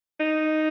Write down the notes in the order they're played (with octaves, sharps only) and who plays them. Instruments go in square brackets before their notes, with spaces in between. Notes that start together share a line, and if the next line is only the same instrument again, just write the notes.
[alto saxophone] D#4